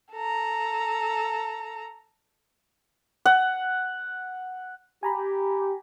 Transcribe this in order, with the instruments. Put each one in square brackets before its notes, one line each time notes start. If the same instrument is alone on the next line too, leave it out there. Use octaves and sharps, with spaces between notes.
[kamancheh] A4 A#5
[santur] F#5
[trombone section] G4 [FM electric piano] G#5 A#5 B5